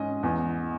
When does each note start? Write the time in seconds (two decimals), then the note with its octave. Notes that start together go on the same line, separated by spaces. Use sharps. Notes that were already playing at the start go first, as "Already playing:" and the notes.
Already playing: G#2 C#4 D#5
0.23 E2